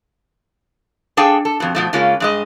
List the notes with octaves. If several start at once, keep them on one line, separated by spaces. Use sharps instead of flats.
D4 G#4 A4 F5 G5
A4
F2 B2
B2 F3 A3
C#3 G#3 A#3 C#4 F4
G2 G#3 D#5